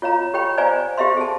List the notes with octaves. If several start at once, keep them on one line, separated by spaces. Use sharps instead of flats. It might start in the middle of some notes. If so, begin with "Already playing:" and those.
F4 C#5 F5 A#5
G4 C#5 G5 B5
C5 D5 F5 G#5 A#5
G4 C5 E5 F5 C6
G#4 A5